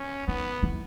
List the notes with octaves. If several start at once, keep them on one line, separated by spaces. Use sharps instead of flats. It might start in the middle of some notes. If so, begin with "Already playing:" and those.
Already playing: C#4
D#3 B3
E3